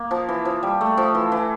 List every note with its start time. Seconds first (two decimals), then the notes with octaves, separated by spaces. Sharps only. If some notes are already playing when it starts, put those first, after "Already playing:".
Already playing: A#3
0.11 F3
0.29 E3
0.45 F3
0.63 G3
0.81 A3
0.97 F3
1.15 E3
1.32 E3